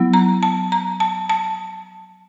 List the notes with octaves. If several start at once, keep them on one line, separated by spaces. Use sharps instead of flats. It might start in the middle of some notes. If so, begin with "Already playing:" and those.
Already playing: F#3 B3 E4
A#5
A5
A#5
A5
A5